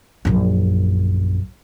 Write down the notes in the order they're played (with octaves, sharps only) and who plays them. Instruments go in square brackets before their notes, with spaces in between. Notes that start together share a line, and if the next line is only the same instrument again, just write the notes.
[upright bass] A#1 F#2